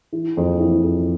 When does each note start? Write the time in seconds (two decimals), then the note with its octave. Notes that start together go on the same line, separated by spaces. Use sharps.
0.12 E3
0.37 F2
0.60 E3
0.84 F2